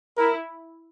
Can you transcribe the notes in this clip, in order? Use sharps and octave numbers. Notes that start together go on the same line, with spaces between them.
E4 A#4